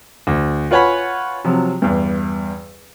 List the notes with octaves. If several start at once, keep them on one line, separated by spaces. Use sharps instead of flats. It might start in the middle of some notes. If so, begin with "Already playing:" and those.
D2
F4 B4 C#5 F#5 G#5 B5
C3 F3 F#3
E2 G2